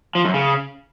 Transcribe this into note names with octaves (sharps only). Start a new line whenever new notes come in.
F3
F#2
C#3